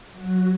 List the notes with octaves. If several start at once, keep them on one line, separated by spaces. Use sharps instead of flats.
F#3 F#4